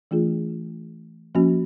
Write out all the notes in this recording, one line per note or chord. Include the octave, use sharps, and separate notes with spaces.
E3 A3 D4 F4 G#4
F3 A#3 C#4 F#4